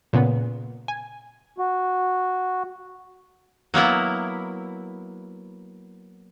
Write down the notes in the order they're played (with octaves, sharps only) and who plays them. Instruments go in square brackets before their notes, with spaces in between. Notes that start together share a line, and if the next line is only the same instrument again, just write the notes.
[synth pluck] A#2 C#3 B3
G#5
[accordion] F#4
[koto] F#3 A#3 B3 E4